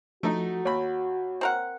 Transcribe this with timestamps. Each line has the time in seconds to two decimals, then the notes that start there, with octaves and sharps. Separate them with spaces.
0.23 F3 A3 D#4 F#4 A4
0.65 D#2 C#5 B5
1.41 C4 A#4 F#5